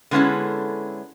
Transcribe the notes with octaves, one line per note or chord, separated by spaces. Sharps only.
D3 G#3 B3 C#4 E4 A4